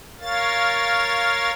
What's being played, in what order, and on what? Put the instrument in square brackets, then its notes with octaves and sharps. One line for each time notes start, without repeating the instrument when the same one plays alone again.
[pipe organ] A#4 C#5 F5 A6